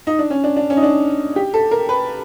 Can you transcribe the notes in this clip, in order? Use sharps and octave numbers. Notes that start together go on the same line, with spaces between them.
D#4
D4
C#4
D4
D4
C#4
D#4
D4
G4
A4
A#4
B4